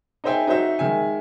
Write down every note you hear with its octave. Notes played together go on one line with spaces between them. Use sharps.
D#4 G#4 C5 E5 G5 G#5
D#4 F#4 C5 E5
D#3 G#3 E5 G#5